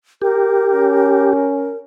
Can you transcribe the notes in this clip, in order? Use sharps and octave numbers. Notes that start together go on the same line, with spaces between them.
G4 A#4
C#4